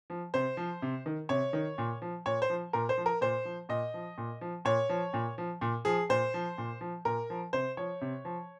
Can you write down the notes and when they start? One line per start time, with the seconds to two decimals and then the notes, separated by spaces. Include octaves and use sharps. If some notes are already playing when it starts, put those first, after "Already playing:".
0.10 F3
0.34 C3 C5
0.57 F3
0.82 C3
1.06 D#3
1.29 C3 C#5
1.53 D#3
1.78 A#2
2.02 F3
2.26 A#2 C#5
2.42 C5
2.50 F3
2.73 A#2 A#4
2.89 C5
2.98 F3
3.06 A#4
3.21 A#2 C5
3.45 F3
3.69 A#2 D#5
3.94 F3
4.18 A#2
4.41 F3
4.65 A#2 C#5
4.89 F3
5.13 A#2
5.38 F3
5.61 A#2
5.85 F3 G#4
6.09 A#2 C5
6.34 F3
6.58 A#2
6.81 F3
7.05 A#2 A#4
7.30 F3
7.53 C3 C5
7.77 F3 C#5
8.01 C3
8.25 F3